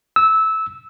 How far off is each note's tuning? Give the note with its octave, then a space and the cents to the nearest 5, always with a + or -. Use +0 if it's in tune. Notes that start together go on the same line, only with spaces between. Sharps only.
E6 -15